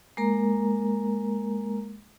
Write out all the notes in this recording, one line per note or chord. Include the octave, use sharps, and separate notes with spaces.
G#3 A#3 A#4 A#5